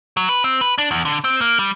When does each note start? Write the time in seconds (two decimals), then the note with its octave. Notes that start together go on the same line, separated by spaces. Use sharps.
0.17 F#3
0.29 B4
0.44 C4
0.61 B4
0.78 D4
0.91 E2
1.05 D3
1.24 C4
1.41 A#3
1.59 G3